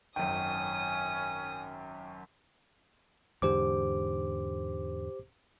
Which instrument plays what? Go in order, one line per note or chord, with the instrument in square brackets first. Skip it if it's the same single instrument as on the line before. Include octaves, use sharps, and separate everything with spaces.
[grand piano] G#1 F#2 [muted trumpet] C#4 [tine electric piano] G5 [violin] D#6 D#7
[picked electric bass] E2 G#2 D3 [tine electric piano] G4 C5 D6